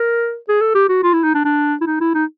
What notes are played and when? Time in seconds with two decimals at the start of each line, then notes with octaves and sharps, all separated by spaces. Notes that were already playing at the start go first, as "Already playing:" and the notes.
Already playing: A#4
0.49 G#4
0.61 A4
0.75 G4
0.89 F#4
1.03 F4
1.13 E4
1.23 D#4
1.34 D4
1.45 D4
1.81 E4
1.86 D#4
2.01 E4
2.14 D#4